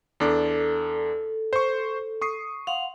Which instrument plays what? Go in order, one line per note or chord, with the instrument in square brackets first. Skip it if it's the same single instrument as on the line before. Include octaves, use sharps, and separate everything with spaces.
[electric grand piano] E2 D4 D6 [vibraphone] A4
[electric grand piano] C5 C#6
C#6 D#6 C7
[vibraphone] F5 F#5 C6